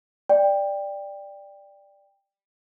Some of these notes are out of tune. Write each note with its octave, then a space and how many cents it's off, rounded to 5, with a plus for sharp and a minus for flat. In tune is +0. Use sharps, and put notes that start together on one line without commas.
D5 +5 G5 +15